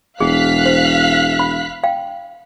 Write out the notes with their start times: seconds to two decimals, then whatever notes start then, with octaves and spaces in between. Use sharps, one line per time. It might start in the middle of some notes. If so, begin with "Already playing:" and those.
0.20 E1 G#4 F5 F#6 B6
0.66 C5
1.39 B5
1.84 F5 G5